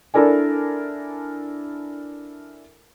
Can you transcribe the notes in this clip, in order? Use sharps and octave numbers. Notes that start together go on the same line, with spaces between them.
D4 E4 A4 A#4 D5 G#5